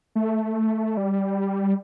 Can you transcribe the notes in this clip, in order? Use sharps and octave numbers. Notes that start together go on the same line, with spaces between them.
A3
G3